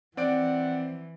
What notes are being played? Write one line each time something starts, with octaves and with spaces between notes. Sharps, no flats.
E3 C4 D5 F#5 D7